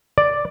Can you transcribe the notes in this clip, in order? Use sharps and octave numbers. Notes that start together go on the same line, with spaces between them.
D5